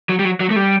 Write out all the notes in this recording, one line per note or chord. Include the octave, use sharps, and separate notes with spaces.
F#3
G3
F#3
F#3
A3
G3